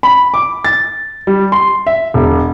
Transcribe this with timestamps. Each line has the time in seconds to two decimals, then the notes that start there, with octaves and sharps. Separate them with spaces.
0.03 B5
0.34 D6
0.65 A6
1.27 G3
1.52 C6
1.87 E5
2.14 E1